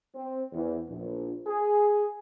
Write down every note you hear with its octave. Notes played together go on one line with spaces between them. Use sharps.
C4
E2
A#1
G#4